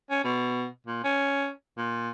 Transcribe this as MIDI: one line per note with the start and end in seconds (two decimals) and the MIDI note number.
0.10 0.23 61
0.24 0.66 47
0.87 0.99 46
1.04 1.49 61
1.77 2.09 46